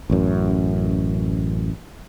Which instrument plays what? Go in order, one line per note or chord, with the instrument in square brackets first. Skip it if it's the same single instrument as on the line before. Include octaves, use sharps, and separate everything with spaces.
[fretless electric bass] A1 F#2